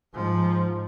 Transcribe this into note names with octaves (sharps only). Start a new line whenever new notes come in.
G#2 F3